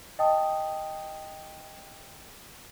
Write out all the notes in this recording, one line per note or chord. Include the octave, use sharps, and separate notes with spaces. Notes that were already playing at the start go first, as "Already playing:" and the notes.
D#5 G5 A5 D#6